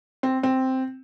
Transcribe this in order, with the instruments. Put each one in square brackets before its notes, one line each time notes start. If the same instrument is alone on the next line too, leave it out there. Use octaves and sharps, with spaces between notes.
[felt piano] C4
C4